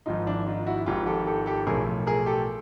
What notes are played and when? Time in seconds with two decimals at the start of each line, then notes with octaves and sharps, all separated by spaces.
0.06 G#1 G#2 F3 D#4 F4
0.27 D4 E4
0.46 D#4 F4
0.66 E4 F#4
0.86 G#1 G#2 F3 F4 G4
1.06 G4 A4
1.26 G4 A4
1.46 G4 A4
1.67 B1 A2 F3 G#4 A#4
2.07 G#4 A#4
2.26 G4 A4